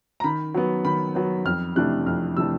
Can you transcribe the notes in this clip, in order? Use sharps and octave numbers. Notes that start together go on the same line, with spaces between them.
A#5
D#3 B5
F#3 B3
D#3 B5
F#3 B3
F2 F6
C3 E3 A3 D4 F#6
F2 F6
C3 E3 A3 D4 E6